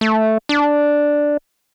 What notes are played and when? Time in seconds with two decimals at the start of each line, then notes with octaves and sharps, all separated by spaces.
0.01 A3
0.49 D4